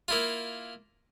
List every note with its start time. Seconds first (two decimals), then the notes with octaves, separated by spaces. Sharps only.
0.08 A#3 E4 F4